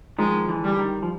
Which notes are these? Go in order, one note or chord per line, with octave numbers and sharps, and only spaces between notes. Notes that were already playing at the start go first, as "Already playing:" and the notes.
D#3 F3 G#3
D3 E3
G3
D#3
F3